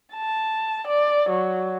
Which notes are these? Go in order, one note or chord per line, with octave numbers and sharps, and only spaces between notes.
A5
D5
F#3